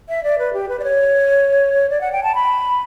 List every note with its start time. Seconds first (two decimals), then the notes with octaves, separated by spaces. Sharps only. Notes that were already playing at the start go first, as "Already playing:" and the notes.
0.09 E5
0.24 D5
0.39 B4
0.53 G4
0.69 B4
0.80 D5
0.84 C#5
1.90 D5
2.01 F#5
2.12 G5
2.23 A5
2.35 B5